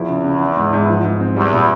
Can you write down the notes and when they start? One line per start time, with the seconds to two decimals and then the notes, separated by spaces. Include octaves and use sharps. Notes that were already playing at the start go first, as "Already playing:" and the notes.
Already playing: E2 F3 E4
0.09 C#3
0.25 C#3
0.41 E3
0.57 G#2
0.73 G#2
0.88 F3
1.04 G#2
1.20 C4
1.36 E2 G3
1.52 A#2